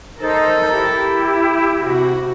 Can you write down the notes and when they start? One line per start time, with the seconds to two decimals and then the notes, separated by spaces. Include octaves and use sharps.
0.20 D#4 A4 A#4 C5
0.71 E4 G4
1.78 C3 F#4